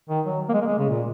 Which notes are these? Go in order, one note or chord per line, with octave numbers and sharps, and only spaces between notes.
D#3
F#3
A#3
G#3
A#3
G#3
C#3
A#2